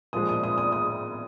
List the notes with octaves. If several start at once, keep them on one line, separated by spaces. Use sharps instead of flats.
A#2 F3 G#3 D#6
D#6
D#6
D#6
D#6